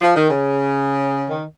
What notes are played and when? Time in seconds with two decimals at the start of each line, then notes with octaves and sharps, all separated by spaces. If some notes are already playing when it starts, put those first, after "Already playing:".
0.01 F3
0.15 D#3
0.29 C#3
1.29 D#3